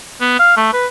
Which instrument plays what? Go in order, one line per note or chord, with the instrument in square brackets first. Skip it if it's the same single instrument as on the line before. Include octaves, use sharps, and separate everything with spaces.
[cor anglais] B3
F5
A3
B4